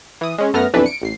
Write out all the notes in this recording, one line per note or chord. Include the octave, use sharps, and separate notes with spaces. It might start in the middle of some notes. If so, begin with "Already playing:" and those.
E3 D#6
G#3 C#4
F#2 A3 B3 F6 A#6
B1 F2 E3 D4 B4
C#7 D7
A1 C7